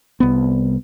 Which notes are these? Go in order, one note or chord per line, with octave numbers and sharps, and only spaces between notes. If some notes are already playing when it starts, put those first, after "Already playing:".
C2 B3